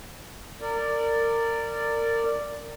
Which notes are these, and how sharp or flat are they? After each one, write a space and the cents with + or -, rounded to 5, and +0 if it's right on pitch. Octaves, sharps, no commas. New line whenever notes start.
A#4 -25 D5 +0